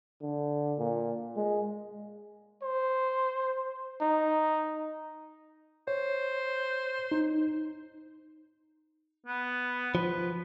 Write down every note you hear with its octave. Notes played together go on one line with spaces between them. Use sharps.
D3
A#2
G#3
C5
D#4
C5 C#5
D#4
B3
F3 B4